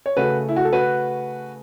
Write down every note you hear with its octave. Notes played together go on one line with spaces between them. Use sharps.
C#5
C#3 A3 F#4 B4
E4
F#4
A4
F#4 B4